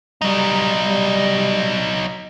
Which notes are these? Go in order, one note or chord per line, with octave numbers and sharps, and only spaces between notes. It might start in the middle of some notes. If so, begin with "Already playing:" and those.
F#3 G3 D#4
G3